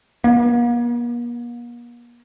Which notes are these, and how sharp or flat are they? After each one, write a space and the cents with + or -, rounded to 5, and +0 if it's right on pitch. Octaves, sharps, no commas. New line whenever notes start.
A#3 +45